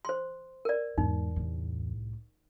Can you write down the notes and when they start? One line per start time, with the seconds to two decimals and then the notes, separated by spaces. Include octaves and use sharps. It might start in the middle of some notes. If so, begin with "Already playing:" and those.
0.05 C5 C6
0.65 A#4 D5
0.98 E2 G#2 D#4
1.36 C2 A2